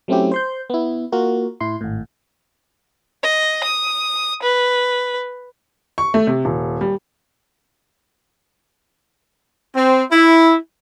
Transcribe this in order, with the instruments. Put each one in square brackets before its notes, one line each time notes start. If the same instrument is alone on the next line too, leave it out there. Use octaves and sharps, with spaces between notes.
[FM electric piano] F#3 A3 C4 C#4 E4 G4
C5 C6 G6
B3 E4
A#3 F4 F#4 A#4
A2 E4 C6
G#1 A2
[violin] D#5
D#6
B4
[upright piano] C#6
A3
C3
D#1
G3
[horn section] C4
E4